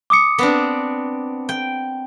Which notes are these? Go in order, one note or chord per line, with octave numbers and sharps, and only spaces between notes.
D6 D#6 C#7
B3 C4 D4
G5